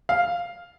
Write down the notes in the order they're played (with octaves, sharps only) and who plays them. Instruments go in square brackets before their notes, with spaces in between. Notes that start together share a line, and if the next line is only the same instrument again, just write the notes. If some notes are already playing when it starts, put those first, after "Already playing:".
[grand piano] F5